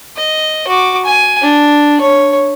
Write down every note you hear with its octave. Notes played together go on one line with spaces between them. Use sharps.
D#5
F#4 D6
G#5
D4
C#5